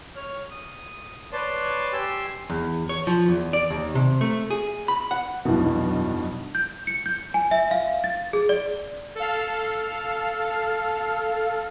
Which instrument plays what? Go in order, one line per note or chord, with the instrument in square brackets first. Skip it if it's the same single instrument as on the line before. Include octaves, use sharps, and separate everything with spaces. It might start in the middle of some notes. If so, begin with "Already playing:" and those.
[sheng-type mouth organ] C#5 F6
D#6
B4 C#5 D5 A5 C6
G4 G#5 C6 E6
[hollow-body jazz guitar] E2
C#5
F3
E2
D5
D#2
C3
A3
G#4
B5
F#5
[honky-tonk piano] F1 B1 G2 B2 E3
[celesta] G6
C#7
G6
G#5
E5
F5
A6
G#4
D5
[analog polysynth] A4 F5